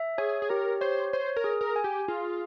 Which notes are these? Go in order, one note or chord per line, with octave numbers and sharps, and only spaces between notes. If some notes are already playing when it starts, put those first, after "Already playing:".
Already playing: E5
G#4 C#5
G#4
G4 A#4
C5 C#5
C5 C#5
A#4
G#4
A#4
G#5
G4
F4 G#4